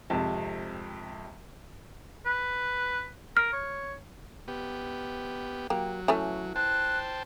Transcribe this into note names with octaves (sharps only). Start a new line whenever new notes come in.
G#1 F2 C3 A5
B4
A#4 F6
C#5
B3 G4
F#3 A#3 G4
E3 A3 C#4
C5 G5 A5 F#6